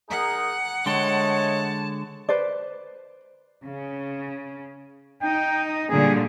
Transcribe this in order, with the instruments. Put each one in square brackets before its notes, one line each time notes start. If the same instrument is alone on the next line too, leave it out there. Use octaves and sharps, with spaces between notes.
[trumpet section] D#4 G#4 A#4 [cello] F#5
[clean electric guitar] D3 G#3 G5 [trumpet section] A3 C#5 D#5 [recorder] A5
[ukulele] B4 C5 D5
[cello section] C#3
[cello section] D#4 [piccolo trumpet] G5
[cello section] A#2 D3 G3 [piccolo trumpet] G#4